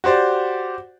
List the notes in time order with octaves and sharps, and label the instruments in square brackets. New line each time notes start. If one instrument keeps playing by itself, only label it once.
[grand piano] F#4 G4 C5 D5